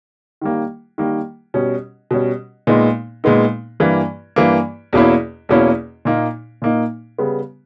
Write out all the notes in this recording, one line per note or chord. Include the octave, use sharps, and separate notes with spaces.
D#3 G3 A#3
D#3 G3 A#3
B2 G3 C#4
B2 G3 C#4
A#2 G#3 B3 D#4
A#2 G#3 B3 D#4
G2 E3 A#3
G2 E3 A#3
E2 B2 A#3 C#4 E4
E2 B2 A#3 C#4 E4
A#2 A#3 D#4
A#2 A#3 D#4
C#3 G3 B3